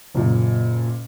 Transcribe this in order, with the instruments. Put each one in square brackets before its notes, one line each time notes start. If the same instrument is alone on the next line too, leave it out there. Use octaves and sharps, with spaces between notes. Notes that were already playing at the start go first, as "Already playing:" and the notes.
[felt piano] F#1 A#2